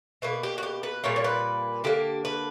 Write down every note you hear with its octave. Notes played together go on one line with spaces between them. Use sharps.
B2 A#3 B4
G4
F#4
G4
B4
A#2 G3 A#3 C#5
C#5
B4
D3 A#3 G4
B4